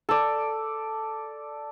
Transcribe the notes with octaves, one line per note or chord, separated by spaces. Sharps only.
A4 D5